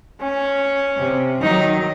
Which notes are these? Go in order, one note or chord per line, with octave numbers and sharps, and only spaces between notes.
C#4
C3
D#3 F#3 D#4